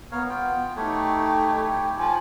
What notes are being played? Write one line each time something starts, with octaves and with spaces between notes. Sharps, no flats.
B3 A#4 C#5 F5
F4 F#5 G5
A3 D#4 E4 G4 C#5 G5
F3 G#5